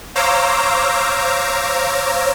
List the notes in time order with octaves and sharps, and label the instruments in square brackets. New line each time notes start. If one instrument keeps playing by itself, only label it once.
[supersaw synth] C5 C#5 F5 A#5 D6 E6